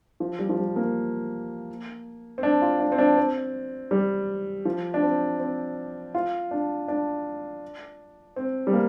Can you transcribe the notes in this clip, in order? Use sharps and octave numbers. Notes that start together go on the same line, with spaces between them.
F3
G3
F3
G3
A#3
C4
D4
F4
D4
C4
D4
C4
G3
F3
D4
C4
C4
F4
D4
D4
C4
G3
A#3